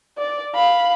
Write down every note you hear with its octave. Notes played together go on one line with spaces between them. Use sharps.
D5
F5 B5